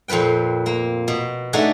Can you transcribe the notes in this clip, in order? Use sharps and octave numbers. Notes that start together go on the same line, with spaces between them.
F2 A#2 C4 B4 G5
A#3
B2
A3 D4 D#4 F#4 G#4 E5